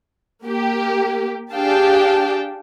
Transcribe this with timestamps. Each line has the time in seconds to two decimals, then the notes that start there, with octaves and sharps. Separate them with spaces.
0.45 A#3 G4
1.53 D4 G4 G#4 F5 G5 A5